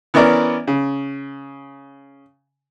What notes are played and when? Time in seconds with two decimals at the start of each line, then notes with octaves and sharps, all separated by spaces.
0.14 E3 B3 C#4 A#4 D5
0.67 C#3